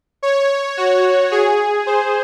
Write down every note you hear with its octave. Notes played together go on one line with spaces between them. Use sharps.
C#5
F#4
G#4
C5